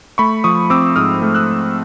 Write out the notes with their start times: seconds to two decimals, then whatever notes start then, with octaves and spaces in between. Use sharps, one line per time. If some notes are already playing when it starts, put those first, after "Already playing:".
0.18 A3 B5 C#6
0.44 F3 C#6 D#6
0.70 C4 D6 E6
0.96 G#2 D#6 F6
1.22 A3
1.35 E6 F#6